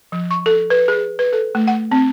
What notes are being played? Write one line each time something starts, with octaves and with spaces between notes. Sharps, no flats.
F3
C#6
A4
B4
G#4
B4
A4
A3
F#5
C4